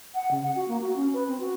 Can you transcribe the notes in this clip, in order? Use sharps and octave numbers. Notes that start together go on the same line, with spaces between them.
F#5
C#3
F#5
F#4
A#3
F#4
C#4
B4
C4
F#4